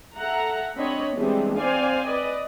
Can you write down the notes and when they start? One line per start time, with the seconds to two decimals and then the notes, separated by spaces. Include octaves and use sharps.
0.16 A4 E5 F#5 A#5
0.77 C4 D4 C#5 D#5 B5
1.17 E3 G3 G#3 B3 C4 D4
1.58 C4 C5 D5 F5 G#5
2.07 B4 D5 D#5